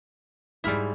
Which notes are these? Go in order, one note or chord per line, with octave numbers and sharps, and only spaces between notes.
G#2 G3 E4 F6 B6